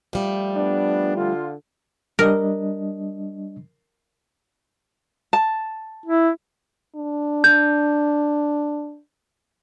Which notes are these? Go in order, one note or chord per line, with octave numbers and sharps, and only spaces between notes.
F3 G3 A3
B3 D4
D3 F4
G3 D4 A#4 D#5
A5
E4
D4
G6